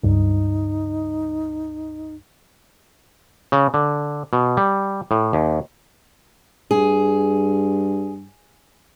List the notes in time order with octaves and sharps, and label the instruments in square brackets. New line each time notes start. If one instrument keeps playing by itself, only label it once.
[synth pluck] C#2 G2 [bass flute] D#4
[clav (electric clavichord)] C#3
D3
B2
G3
A2
D#2
[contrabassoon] G2 [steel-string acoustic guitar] G#4